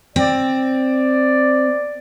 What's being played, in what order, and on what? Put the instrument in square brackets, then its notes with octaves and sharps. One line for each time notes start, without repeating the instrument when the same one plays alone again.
[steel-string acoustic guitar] C4 [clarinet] D5